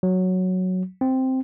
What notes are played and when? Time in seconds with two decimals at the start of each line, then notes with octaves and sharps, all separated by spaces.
0.03 F#3
1.01 C4